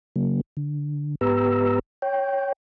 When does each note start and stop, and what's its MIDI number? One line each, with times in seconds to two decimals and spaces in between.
0.16 0.41 49
0.16 0.41 54
0.16 0.41 58
0.57 1.15 50
1.21 1.79 44
1.21 1.79 59
1.21 1.79 67
1.21 1.79 71
1.21 1.79 82
1.21 1.79 88
2.02 2.52 73
2.02 2.52 79